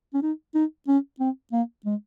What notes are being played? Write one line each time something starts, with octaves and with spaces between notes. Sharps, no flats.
C#4
D#4
D#4
C#4
C4
A#3
G#3